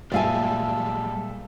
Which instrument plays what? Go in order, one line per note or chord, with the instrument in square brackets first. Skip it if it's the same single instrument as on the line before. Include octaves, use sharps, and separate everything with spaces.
[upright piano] A#2 E5 [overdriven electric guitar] G3 G#3 [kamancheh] A4 [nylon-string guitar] D5 F5 G#5